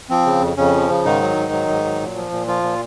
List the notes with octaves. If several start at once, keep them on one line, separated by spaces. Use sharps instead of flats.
F3 C4
C#3
F2
F2 C#3 C#4
F3
C#3
G#2 D#3 D#4
F#3
G#2
F#3
G#2
F#3
A#2
F3
A#2
F3 F4
A#2